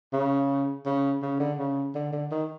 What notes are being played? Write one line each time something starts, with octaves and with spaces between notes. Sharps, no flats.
C#3
C#3
C#3
D3
C#3
D3
D3
D#3